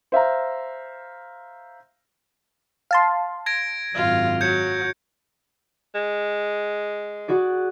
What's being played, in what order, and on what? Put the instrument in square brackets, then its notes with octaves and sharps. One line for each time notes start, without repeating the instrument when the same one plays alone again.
[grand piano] C5 E5 F5 A#5
[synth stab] F5 A5 C6
[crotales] G#6 A#6 D7
[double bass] G#1 F#2 [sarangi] F4
[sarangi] F#3 [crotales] G6 G#6 C#7
[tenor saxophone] G#3
[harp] F#4 G#4 D5